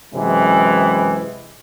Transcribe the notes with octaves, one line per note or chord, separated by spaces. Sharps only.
F#2 C3 E3 G#3